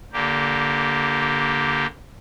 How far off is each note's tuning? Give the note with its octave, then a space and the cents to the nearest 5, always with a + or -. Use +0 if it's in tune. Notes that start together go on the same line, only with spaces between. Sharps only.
D3 -20 A#3 +0 G4 +0